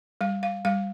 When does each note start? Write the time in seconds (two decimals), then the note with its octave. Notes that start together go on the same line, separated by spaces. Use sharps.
0.21 G3 F5
0.43 F5
0.65 G3 F5